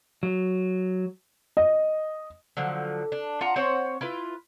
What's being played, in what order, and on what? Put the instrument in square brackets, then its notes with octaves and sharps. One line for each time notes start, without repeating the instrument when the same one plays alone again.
[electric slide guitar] F#3
[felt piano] D#5
[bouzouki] D3 F3 F#3
D4
F4 F#5 A#5
C4 C5 C#5 F#5
E4 F4 B4